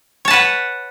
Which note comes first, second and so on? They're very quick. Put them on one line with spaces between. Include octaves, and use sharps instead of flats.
C#5 A5 B4 F#5